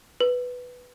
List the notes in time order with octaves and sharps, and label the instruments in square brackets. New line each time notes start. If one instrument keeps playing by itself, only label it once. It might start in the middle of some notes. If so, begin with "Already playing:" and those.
[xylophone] B4